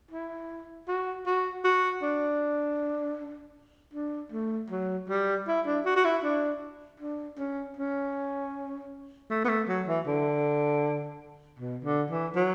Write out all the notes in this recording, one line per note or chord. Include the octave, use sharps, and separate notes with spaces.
E4
F#4
F#4
F#4
D4
D4
A3
F#3
G3
E4
D4
F#4
F#4
E4
D4
D4
C#4
C#4
A3
B3
A3
F#3
E3
D3
B2
D3
E3
F#3